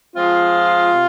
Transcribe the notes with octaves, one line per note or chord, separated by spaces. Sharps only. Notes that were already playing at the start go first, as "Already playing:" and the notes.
F3 G#3 C4 F4
C3